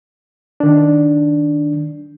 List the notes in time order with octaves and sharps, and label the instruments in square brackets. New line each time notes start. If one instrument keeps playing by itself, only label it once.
[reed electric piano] D#3 D4